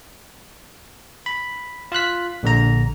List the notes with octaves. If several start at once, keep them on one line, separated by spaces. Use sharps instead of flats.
B5
F4 F5 F#6 B6
A#1 D3 A#5